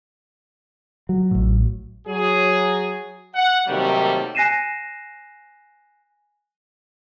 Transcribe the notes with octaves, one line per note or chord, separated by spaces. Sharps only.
F#3
A1 A2
F#3 G#4
F#5
C3 D#3 F#3 G3 A3 A#3
G#5 F#6 A#6 C7 D#7 E7